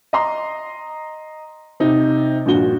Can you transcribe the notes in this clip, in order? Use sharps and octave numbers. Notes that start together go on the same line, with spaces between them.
D#5 A#5 C6
C3 D#4
A#1 G2 A#2 F#4 G7